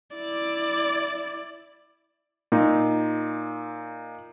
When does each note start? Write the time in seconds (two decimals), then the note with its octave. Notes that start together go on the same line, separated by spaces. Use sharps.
0.15 E4 D5
2.52 A#2 D#4